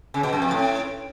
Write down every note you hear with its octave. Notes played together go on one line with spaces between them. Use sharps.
C#3
B2
F#2
F2
A2